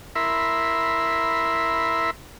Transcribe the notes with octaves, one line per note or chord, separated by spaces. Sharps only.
E4 A#4 E5 B5 C6